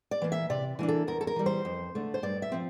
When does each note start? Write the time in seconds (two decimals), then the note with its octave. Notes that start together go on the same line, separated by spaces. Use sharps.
0.11 D5
0.22 E3 A#3
0.32 E5
0.50 C3 D5
0.79 E3 A#3 D4
0.88 A4
1.07 E2 A#4
1.21 A4
1.27 A#4
1.36 E3 G3
1.46 C5
1.65 F2
1.95 D3 A3 D4
2.14 C5
2.23 G2 D5
2.42 E5
2.52 F3 C4